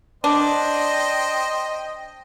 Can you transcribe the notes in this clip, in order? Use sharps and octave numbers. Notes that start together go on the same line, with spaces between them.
D4 C5 D#5 G5